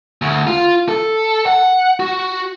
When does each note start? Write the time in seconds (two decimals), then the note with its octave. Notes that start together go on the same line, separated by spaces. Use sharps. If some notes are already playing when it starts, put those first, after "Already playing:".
0.22 D2
0.47 F4
0.89 A4
1.46 F#5
2.00 F#4